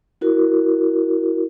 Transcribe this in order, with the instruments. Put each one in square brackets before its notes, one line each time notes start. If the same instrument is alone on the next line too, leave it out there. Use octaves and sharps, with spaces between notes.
[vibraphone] E4 F#4 A#4